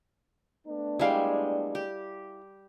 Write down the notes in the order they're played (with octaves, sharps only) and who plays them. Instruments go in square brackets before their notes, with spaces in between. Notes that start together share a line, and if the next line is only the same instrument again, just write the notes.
[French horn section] A3 B3 D4
[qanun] G3 G#3 [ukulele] E4 F5 G5
[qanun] G4